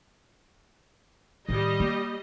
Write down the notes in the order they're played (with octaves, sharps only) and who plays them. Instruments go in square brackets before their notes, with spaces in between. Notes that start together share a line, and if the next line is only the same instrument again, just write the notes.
[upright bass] A2 D#3 [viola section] G3 D#5
[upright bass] A#3